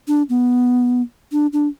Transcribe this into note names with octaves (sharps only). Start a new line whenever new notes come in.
D4
B3
D4
D4